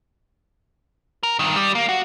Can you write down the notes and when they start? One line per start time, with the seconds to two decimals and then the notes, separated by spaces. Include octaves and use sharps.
1.23 A#4
1.39 G2 D#3
1.56 G3
1.75 A#3
1.89 F#4